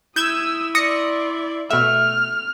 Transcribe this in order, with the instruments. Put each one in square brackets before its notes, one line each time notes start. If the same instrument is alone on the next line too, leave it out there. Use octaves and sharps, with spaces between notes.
[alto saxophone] E4 [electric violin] D#6 E6 [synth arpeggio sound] G6 G#6 E7
[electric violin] D5 C6 [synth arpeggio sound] D#6 A#6 C#7
[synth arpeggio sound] B2 E5 [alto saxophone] A3 [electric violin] F6